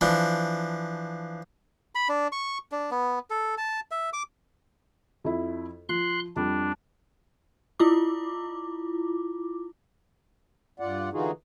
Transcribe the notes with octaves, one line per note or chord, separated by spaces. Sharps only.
E3 F3 D4
B5
D4
C#6
D4
B3
A4
A5
E5
D6
F2 E4
F3 C6 F#6
F2 G3 D4
E4 F4 D6
G2 F4 D5 F#5
D3 E3 D#4 F4 F#4 G#4